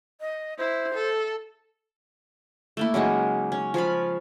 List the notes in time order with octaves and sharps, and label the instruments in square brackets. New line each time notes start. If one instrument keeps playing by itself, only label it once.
[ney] D#5
[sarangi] E4 [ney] C5
[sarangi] A4
[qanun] A3 A#3 E4
C#3 F#3 G#3 D#4
C#4
F3 C#5 F5 B5